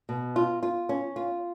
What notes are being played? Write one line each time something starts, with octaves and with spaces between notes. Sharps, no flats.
B2
F4
F4
C#4
F4